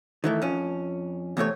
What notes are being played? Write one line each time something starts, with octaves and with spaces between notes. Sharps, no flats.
D#3 E3 A3
F2 C#4
E2 C3 A3 C#5